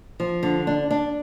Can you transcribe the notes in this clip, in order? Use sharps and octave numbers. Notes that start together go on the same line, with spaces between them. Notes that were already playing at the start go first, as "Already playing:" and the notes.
F3
D3
D4
D4